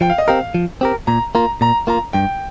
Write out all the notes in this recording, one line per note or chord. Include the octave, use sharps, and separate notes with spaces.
F3 G5
F5
D#5
C4 G4 A#4 F5
F3
C4 G4 A#4
A#2 A#5
A#3 F4 A#5
A#2 A#5
A#3 F4 A#5
G2 G5